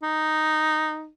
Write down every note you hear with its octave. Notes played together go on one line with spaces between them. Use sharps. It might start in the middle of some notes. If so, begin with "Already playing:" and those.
D#4